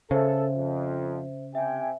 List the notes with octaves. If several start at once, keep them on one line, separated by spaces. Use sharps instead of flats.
C#3 A4 C5 E5
F2
C3 E5 G5 G#5